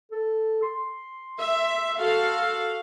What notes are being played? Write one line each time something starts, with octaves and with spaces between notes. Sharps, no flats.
A4
C6
E5
F#4 A4 F5